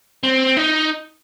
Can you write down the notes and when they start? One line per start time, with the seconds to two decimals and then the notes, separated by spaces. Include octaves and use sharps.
0.24 C4
0.57 D#4